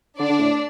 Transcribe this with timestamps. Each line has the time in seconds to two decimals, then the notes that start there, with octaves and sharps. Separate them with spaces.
0.19 D3 D4 D5
0.29 D3
0.40 A2